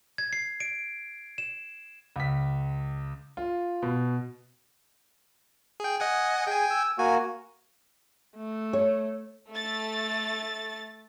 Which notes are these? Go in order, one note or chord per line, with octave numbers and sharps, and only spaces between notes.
G#6
C7
D7
E7
C#2 B6
F4
B2
G#4 G5
D#5 F#5 G#5
G#4 G5 G#5
E6
A#3 F#4 G#5
A3
C#5
A3 A6